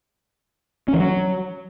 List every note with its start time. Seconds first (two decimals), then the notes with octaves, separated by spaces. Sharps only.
0.88 C#4
0.94 E3
0.99 F#3